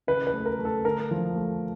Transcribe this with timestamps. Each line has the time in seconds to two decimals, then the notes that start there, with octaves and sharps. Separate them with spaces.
0.07 C#3 B4
0.27 B4
0.33 A3
0.46 A#4
0.59 A3
0.65 A4
0.84 D3 A#4
1.11 F3
1.35 A3